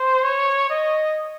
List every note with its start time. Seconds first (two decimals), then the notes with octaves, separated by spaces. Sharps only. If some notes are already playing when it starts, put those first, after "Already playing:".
Already playing: C5
0.24 C#5
0.70 D#5